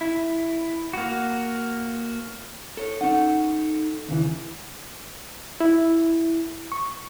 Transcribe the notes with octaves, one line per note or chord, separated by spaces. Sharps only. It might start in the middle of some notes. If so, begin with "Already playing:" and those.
E4
A#3 F#4
A4 C#5
C#4 D#4 A4 F#5
D#2 C#3 E3
E4
C#6